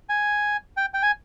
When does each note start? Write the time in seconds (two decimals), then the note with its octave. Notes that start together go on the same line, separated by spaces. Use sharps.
0.09 G#5
0.77 G5
0.94 G5
1.03 G#5